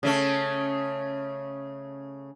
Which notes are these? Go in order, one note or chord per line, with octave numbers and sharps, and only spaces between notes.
C#3 A3 C#4